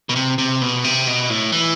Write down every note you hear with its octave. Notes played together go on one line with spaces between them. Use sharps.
B2
C3
C3
B2
C3
B2
A2
E3